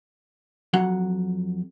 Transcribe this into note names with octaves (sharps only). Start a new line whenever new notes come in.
F2 F#3 F#5